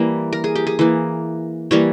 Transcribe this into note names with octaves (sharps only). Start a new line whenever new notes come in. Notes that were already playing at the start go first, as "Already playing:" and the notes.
Already playing: E3 G3 A#3
A#4
G#4
G4
G#4
E3 A#3
E3 G3 A#3 C#5